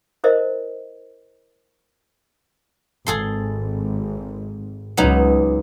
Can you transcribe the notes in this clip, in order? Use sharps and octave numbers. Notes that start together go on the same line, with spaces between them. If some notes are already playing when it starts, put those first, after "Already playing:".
E4 A#4 C5 D#5 E5
G#1 G#4 A4 C6
C#2 F#3 B3 D#4